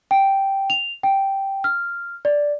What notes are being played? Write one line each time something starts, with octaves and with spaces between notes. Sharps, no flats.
G5
F7
G5
F6
D5